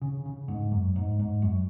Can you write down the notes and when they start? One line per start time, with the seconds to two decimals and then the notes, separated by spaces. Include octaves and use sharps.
0.02 C#3
0.25 C#3
0.48 G#2
0.72 F#2
0.96 G#2
1.19 G#2
1.42 F#2